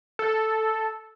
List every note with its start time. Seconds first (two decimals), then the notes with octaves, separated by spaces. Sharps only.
0.19 A4